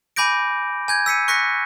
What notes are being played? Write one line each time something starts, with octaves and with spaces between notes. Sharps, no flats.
G#5 B5 D6 G6 A#6 D7
G#5 G6 G#6
E6 B6 C#7 D#7
C#6 F#6 A#6 B6 C#7